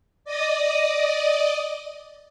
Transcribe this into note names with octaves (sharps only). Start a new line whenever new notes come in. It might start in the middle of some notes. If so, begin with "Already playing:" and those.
D5 D#5 D#6